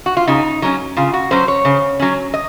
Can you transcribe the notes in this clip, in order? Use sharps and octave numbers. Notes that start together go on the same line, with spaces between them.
F#4
F4
C#3 D#4
F#3 C#4
C#3 F4
F#4
F#3 C#4 C5
C#5
C#3
F#3 C#4
D#5